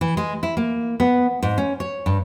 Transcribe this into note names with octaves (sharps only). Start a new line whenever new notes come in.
E3
G#3
E4
A#3
B3
G#2
C#4
C#5
G2